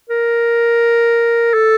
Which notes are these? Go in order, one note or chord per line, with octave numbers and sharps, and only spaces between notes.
A#4
A4